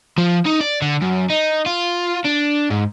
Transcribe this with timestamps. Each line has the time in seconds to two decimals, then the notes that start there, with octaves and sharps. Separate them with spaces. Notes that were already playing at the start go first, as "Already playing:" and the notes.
0.18 F3
0.46 D#4
0.61 D5
0.82 D3
1.01 F#2
1.30 D#4
1.66 F4
2.24 D4
2.70 G#2